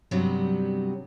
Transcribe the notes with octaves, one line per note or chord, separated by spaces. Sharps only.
G2 C3 F#3 G3 B3